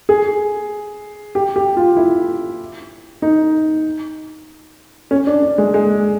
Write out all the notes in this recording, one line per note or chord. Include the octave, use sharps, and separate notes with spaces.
G#4
G4
G4
F4
E4
D#4
C#4
D4
D4
G#3
G#3